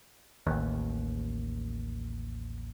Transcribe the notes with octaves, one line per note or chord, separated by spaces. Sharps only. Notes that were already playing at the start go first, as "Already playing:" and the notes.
A1 D#2